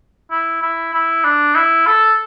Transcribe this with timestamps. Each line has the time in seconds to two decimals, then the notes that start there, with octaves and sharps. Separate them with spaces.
0.31 E4
0.62 E4
0.93 E4
1.24 D4
1.56 E4
1.86 A4